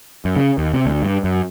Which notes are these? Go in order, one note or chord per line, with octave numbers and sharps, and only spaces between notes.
F#2
C#3
D#2
C3
D2
G2
F#2